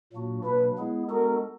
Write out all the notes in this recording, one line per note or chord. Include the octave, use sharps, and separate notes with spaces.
A#2 F#3 A#3 D4 F#4
B2 F#3 A#3 D4 B4
G#3 B3 E4 G#4
G#3 B3 D4 F#4 A4 A#4